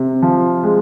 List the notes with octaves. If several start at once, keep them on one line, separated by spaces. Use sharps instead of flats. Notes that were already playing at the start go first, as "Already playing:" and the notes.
Already playing: C3
F3
G#3